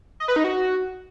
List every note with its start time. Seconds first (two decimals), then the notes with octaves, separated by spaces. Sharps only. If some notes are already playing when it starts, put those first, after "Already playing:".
0.20 D#5
0.28 B4
0.36 D#4
0.44 F#4